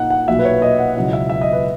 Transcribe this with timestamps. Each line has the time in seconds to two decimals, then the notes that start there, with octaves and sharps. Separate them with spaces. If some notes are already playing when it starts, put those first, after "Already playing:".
Already playing: A#2 A#3 D#4 F#5
0.10 F#5
0.28 B1 A#2 F#3 A#3 E5
0.39 B4
0.45 C#5
0.62 D#5
0.79 F#5
0.96 C#2 B2 F#3 C#4 E4 F#5
1.13 E5
1.30 E5
1.41 D#5
1.53 B4